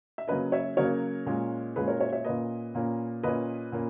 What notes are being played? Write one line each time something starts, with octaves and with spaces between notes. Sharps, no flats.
E5
C#3 F#3 A#3 C#4 B4 D#5
C#5 E5
C#3 F#3 A#3 C#4 A#4 C#5
A#2 G#3 C#4
A#2 G#3 C#4 G#4 B4
A#4 C#5
C#5 E5
C#5 E5
A#2 A#3 C#4 B4 D#5
A#2 A#3 C#4
A#2 A#3 C#4 B4 D#5
A#2 A#3 C#4